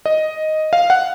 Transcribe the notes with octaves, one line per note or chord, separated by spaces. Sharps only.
D#5
F5
F#5